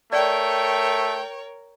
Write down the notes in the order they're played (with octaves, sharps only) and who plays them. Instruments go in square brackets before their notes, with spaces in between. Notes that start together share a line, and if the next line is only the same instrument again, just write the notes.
[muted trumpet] A3 [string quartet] A#4 C#5 [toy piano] D5 [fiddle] G5